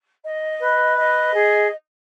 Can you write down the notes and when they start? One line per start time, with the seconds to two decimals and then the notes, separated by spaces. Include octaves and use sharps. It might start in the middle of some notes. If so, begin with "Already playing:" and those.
0.23 D#5
0.60 B4
0.97 D#5
1.33 G#4